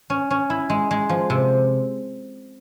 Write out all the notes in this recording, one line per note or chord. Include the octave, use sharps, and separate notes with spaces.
C#4
C#4
E4
G#3
G#3
F3
C3